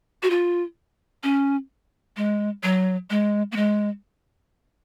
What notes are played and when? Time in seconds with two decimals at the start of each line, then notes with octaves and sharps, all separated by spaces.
0.23 F#4
0.30 F4
1.23 C#4
2.17 G#3
2.63 F#3
3.10 G#3
3.52 A#3
3.56 G#3